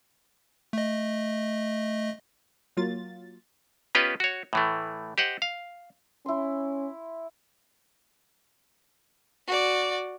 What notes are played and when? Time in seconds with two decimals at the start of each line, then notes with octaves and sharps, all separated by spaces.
0.73 A3 D#5
2.77 F#3 A#3 F4 A6
3.95 B3 C#4 F4 G4 B4 D#5
4.20 F#4 C#5
4.53 A2 E3 A3
5.18 G4 C5 D#5 F#5
5.42 F5
6.26 C#4 E4 C6
9.47 F#4 D5